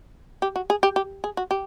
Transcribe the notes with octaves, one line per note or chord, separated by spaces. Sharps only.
G4
F#4
G#4
G4
G4
G#4
F#4
G4